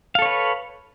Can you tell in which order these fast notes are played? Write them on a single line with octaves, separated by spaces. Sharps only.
F5 A4 C#5 B4